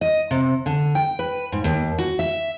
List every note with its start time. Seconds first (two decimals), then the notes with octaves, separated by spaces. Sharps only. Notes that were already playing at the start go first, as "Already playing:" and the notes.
0.01 D#5
0.31 C3
0.66 D3
0.95 G5
1.19 B4
1.52 G#2
1.64 D#2
1.98 F#4
2.19 E5